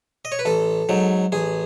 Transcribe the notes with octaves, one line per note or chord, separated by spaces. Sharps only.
D#5
C#5
B4
A1 A4
G#2 F#3
A1 G#4